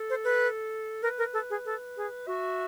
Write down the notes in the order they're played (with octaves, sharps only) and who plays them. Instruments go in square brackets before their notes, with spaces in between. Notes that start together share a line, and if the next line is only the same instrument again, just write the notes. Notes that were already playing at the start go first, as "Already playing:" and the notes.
Already playing: [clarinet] A4
[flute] C5
B4
[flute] A#4 [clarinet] B4
[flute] A#4
A4
G#4
A4
G#4
[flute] F#4 [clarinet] E5